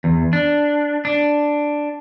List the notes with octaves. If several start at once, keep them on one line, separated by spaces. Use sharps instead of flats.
E2
D4
D4